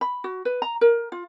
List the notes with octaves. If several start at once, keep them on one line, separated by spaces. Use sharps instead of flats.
B5
F#4
B4
A#5
A#4
F4